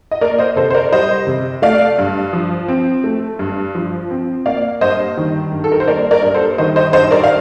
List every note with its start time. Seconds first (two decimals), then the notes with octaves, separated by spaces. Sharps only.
0.11 D#5
0.21 A#3 A#4 D5
0.39 C5 D#5
0.56 C3 A4 C5
0.70 C5
0.75 A#4 D5
0.92 G3 C5 D#5
1.27 C3
1.62 A3 D5 F5
1.99 G2
2.33 F3
2.68 C4
3.04 A3
3.39 G2
3.75 F3
4.11 C4
4.46 A#3 D5 F5
4.81 G2 C5 D#5
5.17 D#3
5.52 G2
5.64 A4
5.72 A#4
5.80 C5
5.87 A#3 A#4 D5
6.11 A#4 D5
6.23 G2
6.34 A4 C5
6.58 D#3 C5 D#5
6.76 C5 D#5
6.93 G2 C5 D#5
7.11 A#4 D5
7.24 F5